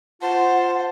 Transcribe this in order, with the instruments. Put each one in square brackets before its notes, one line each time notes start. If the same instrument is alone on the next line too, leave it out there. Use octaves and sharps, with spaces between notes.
[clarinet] F4 [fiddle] C5 [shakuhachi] F#5 [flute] A5